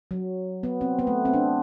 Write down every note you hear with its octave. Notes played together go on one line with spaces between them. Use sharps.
F#3
B3
C4
B3
A3
C4
D4